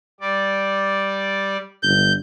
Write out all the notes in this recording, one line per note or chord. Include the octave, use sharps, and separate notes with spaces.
G3 D5
G1 G6